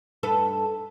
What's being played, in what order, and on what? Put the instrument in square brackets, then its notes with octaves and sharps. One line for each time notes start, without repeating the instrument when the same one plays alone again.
[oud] G2 A4 B4